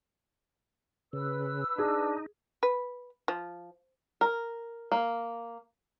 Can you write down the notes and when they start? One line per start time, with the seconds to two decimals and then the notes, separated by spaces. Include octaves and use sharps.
1.13 C#3 B4 E6
1.78 D4 D#4 G#4
2.63 B4
3.28 F3
4.21 A#4
4.92 A#3